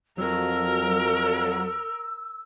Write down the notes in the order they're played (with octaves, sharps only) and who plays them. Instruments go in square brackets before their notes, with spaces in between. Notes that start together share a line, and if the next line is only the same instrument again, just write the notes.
[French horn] F2 [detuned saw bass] F#3 [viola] A#4 [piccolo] E6